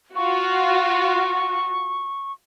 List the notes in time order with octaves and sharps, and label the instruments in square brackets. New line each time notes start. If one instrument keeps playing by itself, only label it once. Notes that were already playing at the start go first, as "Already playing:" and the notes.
[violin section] F4 F#4 [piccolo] C#6